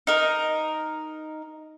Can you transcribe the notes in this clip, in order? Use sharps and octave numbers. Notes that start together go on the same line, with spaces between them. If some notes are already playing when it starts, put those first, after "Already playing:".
D#4 A#4